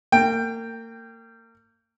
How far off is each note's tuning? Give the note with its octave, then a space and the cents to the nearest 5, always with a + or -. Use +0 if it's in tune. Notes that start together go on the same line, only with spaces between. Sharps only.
A#3 -35 G5 +5